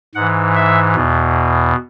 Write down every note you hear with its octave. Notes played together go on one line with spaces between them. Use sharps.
G#2 E3 F#5
E5
E2 B2